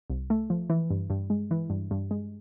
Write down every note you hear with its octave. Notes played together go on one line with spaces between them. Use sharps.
C2
A3
F3
E3
G2
G2
G#3
E3
G2
G2
G#3